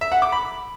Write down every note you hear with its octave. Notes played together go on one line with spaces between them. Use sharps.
E5
F#5
D6
B5